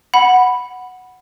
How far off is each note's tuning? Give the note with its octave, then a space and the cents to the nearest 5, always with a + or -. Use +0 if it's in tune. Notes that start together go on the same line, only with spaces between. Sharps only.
F#5 +0 B5 +0